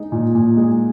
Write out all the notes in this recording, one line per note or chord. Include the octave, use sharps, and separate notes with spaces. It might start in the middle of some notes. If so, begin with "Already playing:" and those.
Already playing: G#3 D#4
A#2
A#2
G#3